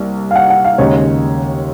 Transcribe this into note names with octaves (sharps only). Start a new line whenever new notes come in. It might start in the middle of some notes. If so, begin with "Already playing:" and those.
Already playing: C2 A#3
F5
F#5
F#5
F5
D#2 C#3 G#3 C#5